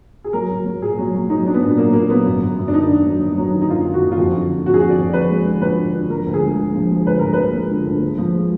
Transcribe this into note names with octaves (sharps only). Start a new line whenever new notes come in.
G#4
F#3 A#4
F#3
F#3
A#2 G#4
F#3
F#3
F#3 D#4
F#3 D4
B3
A#2
F#3 A#3
A#2 A#3
F#3 B3
F#2
F#2
F#2
D4
F#2 D#4
D#3
F#3
F#3
F#3
D#3
D#4
F#2 F4
D#3
F#4
F#2
F4
F2 F#4
D3
D3
F2 F#4
G#4
F2 F#4
D5
F2
F3 B4
G#3
D3
F3 B4
D3
D3
F3 A#4
D2
G#4
G#3
D3
F3
G#3
D2 B4
F3 A#4
B4
F3
G#3
D3
D2
G#3
F3
G#3